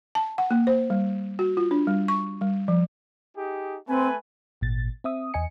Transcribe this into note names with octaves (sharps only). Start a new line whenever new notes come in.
A5
F#5
A#3
C5
G3
F#4
F4
D4
G3
C#6
G3
F3
D#4 G4 G#4
A3 C4 B4 G#5
G#1 A#2 A6
C4 E5 D#6
E2 D#5 G#5 C#7